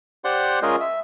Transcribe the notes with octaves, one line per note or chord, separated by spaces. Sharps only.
G4 C5 D5 F#5 C6
G#3 C#4 F4 G#4 A#4 D#5
E5